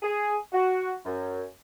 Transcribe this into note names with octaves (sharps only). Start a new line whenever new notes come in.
G#4
F#4
F#2